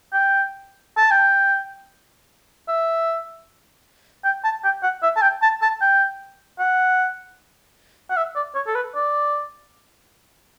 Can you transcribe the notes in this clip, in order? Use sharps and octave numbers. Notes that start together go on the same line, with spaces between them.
G5
A5
G5
E5
G5
A5
G5
F#5
E5
A5
G5
A5
A5
G5
F#5
F#5
E5
D5
C#5
A4
B4
D5